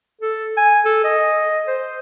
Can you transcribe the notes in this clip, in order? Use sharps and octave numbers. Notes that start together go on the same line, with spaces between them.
A4
G#5
A4
D#5
C5